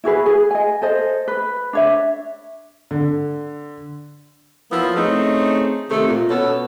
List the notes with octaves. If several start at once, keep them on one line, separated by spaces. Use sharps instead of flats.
E4 F#4 G#4 B4
G#4
D#5 G#5
A4 C5 D#5
B4
D4 C#5 E5
D3
F3 F#3 A#3 B3 E4
A3 C4 C#4 D#4 G#4
C3 D#3 A3
A#2
B2 B3 C#4 A4